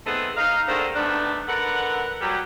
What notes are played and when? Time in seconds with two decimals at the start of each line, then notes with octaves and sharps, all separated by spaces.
0.05 A3 B3 C4 D#4 G#4 A4
0.37 D#4 F5
0.67 D3 D#3 A#3 D4 G#4 C5
0.95 D#3 A3 B3 D4
1.48 D3 A#4 B4 F#5
2.21 F#3 G3 G4